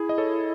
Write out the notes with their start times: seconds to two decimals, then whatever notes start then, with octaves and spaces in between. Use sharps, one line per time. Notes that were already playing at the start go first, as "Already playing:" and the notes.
Already playing: E4 G#4
0.09 D#5
0.18 A4 C#5